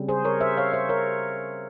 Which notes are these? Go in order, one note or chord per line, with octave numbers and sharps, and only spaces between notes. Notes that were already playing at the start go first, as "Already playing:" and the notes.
Already playing: C#3 G3 C4
G#4 C5
A#4 C#5
C5 E5
C#5 F5
C5 E5
A#4 C#5